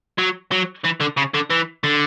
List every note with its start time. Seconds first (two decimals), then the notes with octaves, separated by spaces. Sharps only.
0.18 F#3
0.52 F#3
0.85 E3
1.01 D3
1.17 C#3
1.34 D3
1.50 E3
1.84 D3